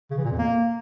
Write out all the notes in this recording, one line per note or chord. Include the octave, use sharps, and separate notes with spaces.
C#3
E3
A#2
F2
A#3